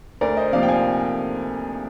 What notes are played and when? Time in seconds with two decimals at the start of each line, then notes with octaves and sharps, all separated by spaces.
0.21 D2 A#4 D5
0.37 C5 D#5
0.53 C3 F3 A#3 D5 F5
0.63 G5
0.68 F5 G#5